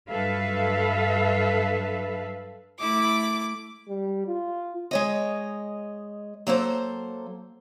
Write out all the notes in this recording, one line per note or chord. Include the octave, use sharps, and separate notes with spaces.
G2 F#3 A4 B4 E5 F5
A3 E4 D6
G3
F4
G#3 C#5 D#5
F#3 A#3 A4 C5